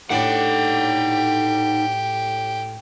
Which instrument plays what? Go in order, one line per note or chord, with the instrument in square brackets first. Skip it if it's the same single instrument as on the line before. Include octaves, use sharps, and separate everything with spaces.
[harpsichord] A2 D4 [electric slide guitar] D#4 F#5 [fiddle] G4